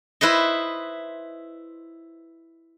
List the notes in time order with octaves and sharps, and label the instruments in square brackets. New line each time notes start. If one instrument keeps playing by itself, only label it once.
[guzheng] E4 B4 C5 D#5